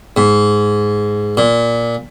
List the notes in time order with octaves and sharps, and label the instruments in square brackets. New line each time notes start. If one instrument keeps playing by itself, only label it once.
[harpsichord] G#2
A#2